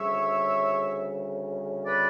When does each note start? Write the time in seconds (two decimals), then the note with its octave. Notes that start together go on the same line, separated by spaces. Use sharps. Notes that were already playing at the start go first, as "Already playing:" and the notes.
Already playing: D2 C#3 G3 C#5 E5
1.85 B4 D5